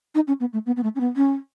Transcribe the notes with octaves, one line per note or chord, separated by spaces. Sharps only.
D#4
C#4
B3
A3
B3
B3
A3
C#4
B3
C#4